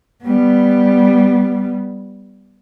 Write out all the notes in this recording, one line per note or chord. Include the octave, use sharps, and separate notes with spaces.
G3 B3